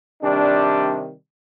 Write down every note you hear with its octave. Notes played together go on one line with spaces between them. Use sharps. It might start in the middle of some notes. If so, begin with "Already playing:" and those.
C3 D#3 G3 D4